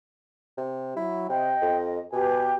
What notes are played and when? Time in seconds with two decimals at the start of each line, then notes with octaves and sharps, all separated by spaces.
0.57 C3
0.96 F#3 E4
1.29 C3 D#5 G5
1.62 F2
2.12 B2 G4 B4 G#5